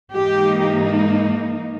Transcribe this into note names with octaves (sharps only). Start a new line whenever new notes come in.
G#2 E3 A#3 D#4 G4